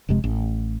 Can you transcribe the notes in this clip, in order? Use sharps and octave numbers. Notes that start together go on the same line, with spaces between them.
F1 F2 C3 G#3
A1